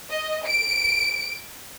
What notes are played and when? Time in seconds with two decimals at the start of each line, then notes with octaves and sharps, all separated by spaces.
0.10 D#5
0.46 D7